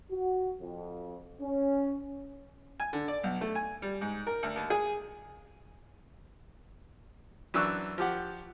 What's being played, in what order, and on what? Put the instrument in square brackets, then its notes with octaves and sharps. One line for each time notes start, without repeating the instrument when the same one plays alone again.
[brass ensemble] F#4
F2
C#4
[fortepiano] G#5
D3
D5
B1
A3
G#5
G3
G#2
A#4
D2
D#2
G#4
F#2 E3 D4 C#6 E6 F#6
F3 G4 F#5